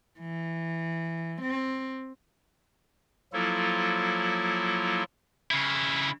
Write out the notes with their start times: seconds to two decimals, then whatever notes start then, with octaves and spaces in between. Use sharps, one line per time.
0.19 E3
1.42 C4
3.33 F3 F#3 A#3 E4 F4 A4
5.51 C#3 E4